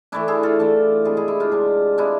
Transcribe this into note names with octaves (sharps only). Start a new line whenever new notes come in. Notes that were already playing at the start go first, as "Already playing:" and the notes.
E3 A3 D4 E4
E4 G#4
F4 A4
E3 A3 D4
C3 G#3 D4 E4 G#4
E4 G#4
E4
D4 F4
C3 G#3 D4
C3 G#3 D4 E4